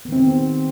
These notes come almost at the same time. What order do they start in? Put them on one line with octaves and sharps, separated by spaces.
B3 D#3 C4